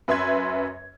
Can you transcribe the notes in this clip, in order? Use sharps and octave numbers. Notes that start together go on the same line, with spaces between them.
F#2 B4 E5 C6 G#6